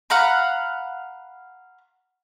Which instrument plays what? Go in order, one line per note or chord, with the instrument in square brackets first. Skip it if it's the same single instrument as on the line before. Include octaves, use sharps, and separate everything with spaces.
[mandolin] F5 F#5 A#5 B5